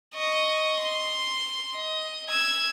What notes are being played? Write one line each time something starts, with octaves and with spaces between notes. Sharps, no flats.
D#5 C#6
C6
D#5
E6 G#6